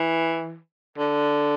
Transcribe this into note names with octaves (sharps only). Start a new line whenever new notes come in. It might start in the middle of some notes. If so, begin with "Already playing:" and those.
Already playing: E3
D3